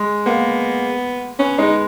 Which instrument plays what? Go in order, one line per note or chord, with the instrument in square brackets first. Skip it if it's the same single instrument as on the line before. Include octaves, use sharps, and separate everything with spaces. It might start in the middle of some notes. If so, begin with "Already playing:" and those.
Already playing: [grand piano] G#3
[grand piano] A#3 [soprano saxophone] B3
[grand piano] B3 [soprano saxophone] C#4
[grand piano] G#3 [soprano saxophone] D#4